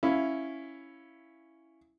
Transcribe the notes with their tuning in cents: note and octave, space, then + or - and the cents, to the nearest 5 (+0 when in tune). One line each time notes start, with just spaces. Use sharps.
C#4 +0 E4 +0 F5 +0